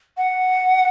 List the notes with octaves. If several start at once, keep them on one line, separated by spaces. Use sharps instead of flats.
F#5